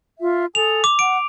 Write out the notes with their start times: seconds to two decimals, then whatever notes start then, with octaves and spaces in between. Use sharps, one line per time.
0.19 F4 E5
0.55 A4 G#5 D#6 F7
0.84 D6
0.99 F#5 D7